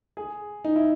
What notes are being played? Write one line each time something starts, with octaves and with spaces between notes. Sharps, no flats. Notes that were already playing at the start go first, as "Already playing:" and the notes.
G#4
D#4
E4